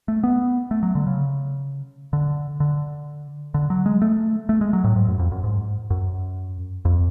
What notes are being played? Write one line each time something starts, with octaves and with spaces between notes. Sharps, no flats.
A3
B3
A3
F#3
D3
C#3
D3
D3
D3
F#3
G#3
A3
A3
G#3
F#3
A2
G#2
F#2
F2
F#2
G#2
F#2
F2